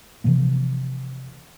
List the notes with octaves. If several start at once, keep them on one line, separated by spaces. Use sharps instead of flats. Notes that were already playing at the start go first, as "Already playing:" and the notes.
C3 E3 F3 A#3